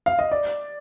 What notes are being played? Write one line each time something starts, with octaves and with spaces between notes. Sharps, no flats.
F5
D#5
D5